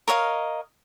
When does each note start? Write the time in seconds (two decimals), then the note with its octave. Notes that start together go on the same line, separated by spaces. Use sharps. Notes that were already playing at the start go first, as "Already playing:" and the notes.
0.08 A#4 C#5 D#5 F5